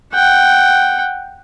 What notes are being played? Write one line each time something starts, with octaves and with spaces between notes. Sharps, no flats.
F#5 G5